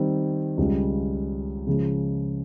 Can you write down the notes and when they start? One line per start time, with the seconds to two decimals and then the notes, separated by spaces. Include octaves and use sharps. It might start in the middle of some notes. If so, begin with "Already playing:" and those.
Already playing: D#3 G3 C4
0.57 C#2 C#3 G3
1.67 C#3 F3 G#3